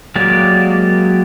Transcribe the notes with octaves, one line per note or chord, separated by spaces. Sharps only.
F#3 G#3 A#3 G4 D5